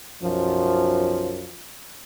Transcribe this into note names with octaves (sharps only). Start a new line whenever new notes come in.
B1 F#2 F3